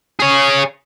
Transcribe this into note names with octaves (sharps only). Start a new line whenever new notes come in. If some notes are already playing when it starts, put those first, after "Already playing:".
G#4 C#5